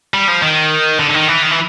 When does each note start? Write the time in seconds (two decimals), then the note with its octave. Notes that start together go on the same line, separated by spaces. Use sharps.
0.14 G3
0.28 F3
0.42 D#3
0.99 D3
1.10 D3
1.14 D#3
1.28 E3
1.42 D#3
1.51 E3